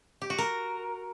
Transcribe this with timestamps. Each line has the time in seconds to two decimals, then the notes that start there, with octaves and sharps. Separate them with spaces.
0.22 G4
0.30 F#4
0.38 A#4